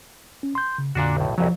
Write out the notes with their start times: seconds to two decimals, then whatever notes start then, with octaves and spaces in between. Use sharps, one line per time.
0.43 C#4
0.55 C6 G6
0.78 C#3
0.95 F2 A#2 D3 D4 F#4
1.17 B1 A2
1.38 C2 F2 F3 F#3